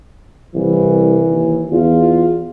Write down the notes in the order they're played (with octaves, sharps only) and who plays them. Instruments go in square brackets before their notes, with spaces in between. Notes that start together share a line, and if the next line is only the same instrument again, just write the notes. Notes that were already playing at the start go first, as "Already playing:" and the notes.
[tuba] C2 [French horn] E3
[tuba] D#2
[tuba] E2 [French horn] F4